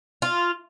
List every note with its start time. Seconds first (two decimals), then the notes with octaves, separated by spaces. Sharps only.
0.22 F4